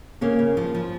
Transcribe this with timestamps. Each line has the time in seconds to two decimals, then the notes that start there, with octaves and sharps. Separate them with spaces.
0.21 C#3 A#3 C#4
0.39 C#3
0.57 F3
0.75 F3